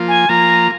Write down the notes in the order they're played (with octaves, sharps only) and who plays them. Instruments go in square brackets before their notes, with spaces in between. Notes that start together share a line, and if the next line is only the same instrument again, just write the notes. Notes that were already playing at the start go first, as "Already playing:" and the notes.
Already playing: [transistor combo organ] F3 A#3 F4
[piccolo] G#5
[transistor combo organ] F3 A#3 F4 [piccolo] A#5